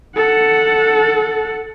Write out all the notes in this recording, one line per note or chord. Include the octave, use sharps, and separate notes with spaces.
A4 F#5